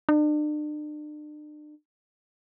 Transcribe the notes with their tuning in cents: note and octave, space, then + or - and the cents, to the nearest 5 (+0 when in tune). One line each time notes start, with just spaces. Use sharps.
D4 +40